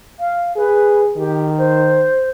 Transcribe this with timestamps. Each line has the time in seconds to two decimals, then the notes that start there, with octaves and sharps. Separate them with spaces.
0.19 F5
0.57 G#4 B4
1.17 D#3 G4
1.58 C5